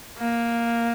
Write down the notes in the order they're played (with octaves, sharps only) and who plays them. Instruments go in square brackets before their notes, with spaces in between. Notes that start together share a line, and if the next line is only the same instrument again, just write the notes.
[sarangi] A#3